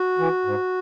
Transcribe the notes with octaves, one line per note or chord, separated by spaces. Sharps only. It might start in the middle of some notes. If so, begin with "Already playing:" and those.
Already playing: F#4
E3
G#2